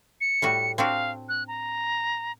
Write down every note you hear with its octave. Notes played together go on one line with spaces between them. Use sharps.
C#7
A2 G3 F#4
C4 D4 F#4 F5
F#6
A#5